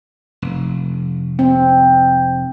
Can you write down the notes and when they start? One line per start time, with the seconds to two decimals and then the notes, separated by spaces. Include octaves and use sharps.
0.42 F1
1.39 C4